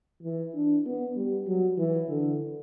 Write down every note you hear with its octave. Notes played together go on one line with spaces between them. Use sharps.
E3
D4
B3
G3
F#3
E3
D3